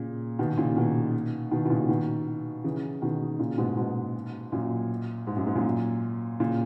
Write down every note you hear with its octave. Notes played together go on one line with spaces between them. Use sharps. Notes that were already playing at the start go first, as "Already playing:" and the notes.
Already playing: A#2 C#3
B2 D#3
A#2 C#3
B2 D#3
B2 D#3
B2
A#2 C#3
B2 D#3
C#3 E3
B2 D#3
A#2 C#3
G#2 B2
G#2 B2
F#2 A#2
G#2
F#2
G#2
F#2 A#2
A#2 C#3